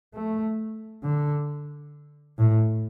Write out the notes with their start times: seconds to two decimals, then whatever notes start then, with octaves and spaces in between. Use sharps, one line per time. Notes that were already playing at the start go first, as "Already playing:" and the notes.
0.14 A3
1.04 D3
2.38 A2